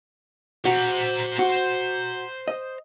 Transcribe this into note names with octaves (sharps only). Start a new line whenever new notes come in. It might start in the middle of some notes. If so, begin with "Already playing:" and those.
F#4 C5 A#5
F#4
D#5